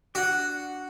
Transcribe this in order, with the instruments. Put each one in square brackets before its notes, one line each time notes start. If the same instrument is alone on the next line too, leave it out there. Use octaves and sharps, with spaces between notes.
[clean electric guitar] D4 F#5 [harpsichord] F#4